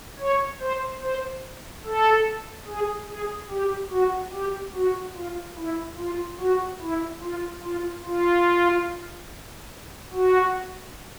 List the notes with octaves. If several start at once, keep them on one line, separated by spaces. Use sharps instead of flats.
C#5
C5
C5
A4
G#4
G#4
G4
F#4
G4
F#4
F4
E4
F4
F#4
E4
F4
F4
F4
F#4